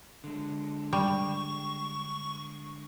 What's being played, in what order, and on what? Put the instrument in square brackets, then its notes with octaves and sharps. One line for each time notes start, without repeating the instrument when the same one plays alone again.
[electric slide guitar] D3 G#3
[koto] G3 [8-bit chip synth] C#6